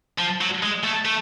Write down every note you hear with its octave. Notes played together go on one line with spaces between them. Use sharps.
F3
F#3
G#3
A3
A3